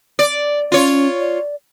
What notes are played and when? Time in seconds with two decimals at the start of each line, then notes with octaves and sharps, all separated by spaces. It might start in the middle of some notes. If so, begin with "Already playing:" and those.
0.19 D5
0.72 C#4 F4 C#5
1.20 D5